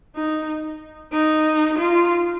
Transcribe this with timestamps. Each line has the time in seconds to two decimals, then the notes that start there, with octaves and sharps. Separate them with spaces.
0.16 D#4
1.13 D#4
1.78 F4